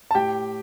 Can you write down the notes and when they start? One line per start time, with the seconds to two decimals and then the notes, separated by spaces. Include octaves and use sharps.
0.11 A5
0.15 A2 G4 G5